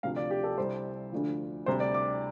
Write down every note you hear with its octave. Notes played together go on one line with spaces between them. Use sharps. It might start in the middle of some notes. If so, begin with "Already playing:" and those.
D2 C3 F3 F5
D5
G4
A4
C2 C3 G3 C5
D2 D3 F3
D2 C3 G3 C5
D5
D6